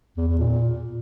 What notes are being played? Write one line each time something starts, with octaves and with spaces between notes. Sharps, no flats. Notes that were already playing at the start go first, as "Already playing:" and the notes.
E2
E2
A#2